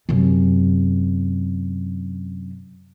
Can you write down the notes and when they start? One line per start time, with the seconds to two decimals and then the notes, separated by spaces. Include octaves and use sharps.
0.09 F#2 C3